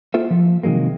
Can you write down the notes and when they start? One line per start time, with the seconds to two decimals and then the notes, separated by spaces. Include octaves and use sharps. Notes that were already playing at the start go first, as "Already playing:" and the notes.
0.14 A#3 F4 A4 C5 E5
0.31 F3
0.63 C3 D#3 F#3 G#3 A#3